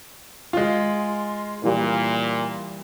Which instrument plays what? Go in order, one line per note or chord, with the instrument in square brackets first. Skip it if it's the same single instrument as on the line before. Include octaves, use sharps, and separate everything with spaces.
[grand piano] G#3 F4
[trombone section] A#2 [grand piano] E3 G3